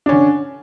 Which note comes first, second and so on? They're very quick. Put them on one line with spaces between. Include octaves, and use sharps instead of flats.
D4 C#4 D3